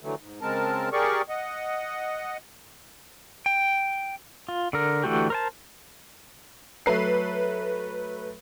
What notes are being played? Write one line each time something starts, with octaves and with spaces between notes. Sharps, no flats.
D3 E3 F#3 A3
G#2
C#3 G#3 C4 A#4 A5
G4 G#4 A#4 D5 C#6
D#5 F#5
G5
F4
D3 A#4
D3 E3 A3 F#4 G4
A#4 C5 A5
F#3 A3 B4 C7